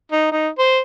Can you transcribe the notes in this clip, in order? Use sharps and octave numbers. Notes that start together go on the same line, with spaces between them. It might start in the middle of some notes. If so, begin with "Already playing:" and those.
D#4
D#4
C5